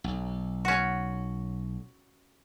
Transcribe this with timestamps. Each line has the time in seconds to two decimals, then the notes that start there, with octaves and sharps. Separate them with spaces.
0.04 B1
0.65 C#4 F#4